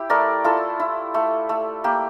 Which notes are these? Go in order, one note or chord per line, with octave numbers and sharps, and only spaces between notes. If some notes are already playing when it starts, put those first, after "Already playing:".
Already playing: E4 G4
A3 A#4 D5
E4 F4 A4
E4
A3
A3
A#3 G4